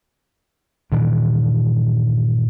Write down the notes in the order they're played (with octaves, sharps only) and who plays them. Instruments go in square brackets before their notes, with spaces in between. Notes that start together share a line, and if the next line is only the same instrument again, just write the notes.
[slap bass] G2 A#2 D#3 E3